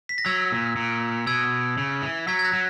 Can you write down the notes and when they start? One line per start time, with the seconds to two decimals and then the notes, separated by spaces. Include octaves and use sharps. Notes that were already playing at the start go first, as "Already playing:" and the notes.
0.09 B6
0.18 A#6
0.26 F#3 E6 G#6
0.52 A#2
0.76 A#2
1.27 B2 E6 G#6
1.78 C#3
2.02 E3
2.27 F#3 G#6 B6
2.39 G#6
2.45 F#6 A#6
2.53 F#3